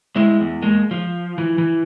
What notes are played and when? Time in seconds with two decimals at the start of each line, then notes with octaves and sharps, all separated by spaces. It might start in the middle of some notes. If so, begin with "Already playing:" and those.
0.16 G#3 E4
0.41 E2
0.62 G#3 A#3
0.91 F3
1.38 E3
1.58 E3